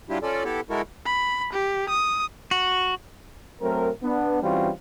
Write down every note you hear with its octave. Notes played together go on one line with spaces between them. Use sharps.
F#3 G3 D4 E4 F4 G4
C#4 F4 A4 D5
B3 E4 G4 A4
G#3 E4 F#4 A4 A#4
B5
G4
D#6
F#4
F#3 A3 C4 A#4
B3 D4
E3 G3 C4 C#4 F4 F#4